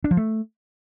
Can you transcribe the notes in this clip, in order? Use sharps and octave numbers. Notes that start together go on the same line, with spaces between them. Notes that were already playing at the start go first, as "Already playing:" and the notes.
D4
F3
A3